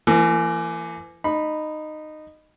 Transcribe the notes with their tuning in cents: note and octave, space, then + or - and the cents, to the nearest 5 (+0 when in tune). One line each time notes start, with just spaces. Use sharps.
E3 +35 A#3 -35
D#4 -15 B5 +0